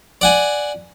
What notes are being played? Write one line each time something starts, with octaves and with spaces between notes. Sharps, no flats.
D5 F#5 G#5